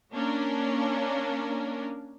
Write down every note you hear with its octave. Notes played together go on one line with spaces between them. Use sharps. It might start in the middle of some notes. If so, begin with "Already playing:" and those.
A#3 C#4 D4 A#4